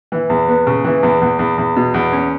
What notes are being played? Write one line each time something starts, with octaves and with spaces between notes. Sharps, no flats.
E3
E2
B3
C#3
E3
E2
E2
E2
E2
B2
E2
C#4